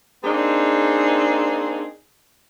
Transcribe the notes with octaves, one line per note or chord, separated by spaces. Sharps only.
A#3 C4 D4 D#4 G#4